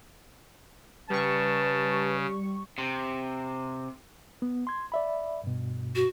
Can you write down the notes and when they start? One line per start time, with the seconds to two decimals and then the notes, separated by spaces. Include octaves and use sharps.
1.10 C#3 G3 B4 A5 C#6
2.78 C3
4.42 B3
4.67 C6 G#6
4.92 D5 E5 B5
5.44 G2 B2
5.96 F#4